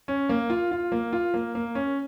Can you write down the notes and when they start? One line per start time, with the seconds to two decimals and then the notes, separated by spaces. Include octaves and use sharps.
0.08 C#4
0.29 A#3
0.50 F4
0.71 F4
0.92 A#3
1.13 F4
1.34 A#3
1.55 A#3
1.75 C#4